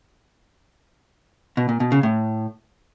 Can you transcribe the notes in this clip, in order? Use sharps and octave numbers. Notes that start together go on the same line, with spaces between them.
B2
A#2
B2
C#3
A2